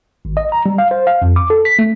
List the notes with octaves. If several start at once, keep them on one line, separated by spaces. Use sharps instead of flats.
G#1
D#5
A#5
G3
F5
C5
F5
F2
D6
A4
B6
A3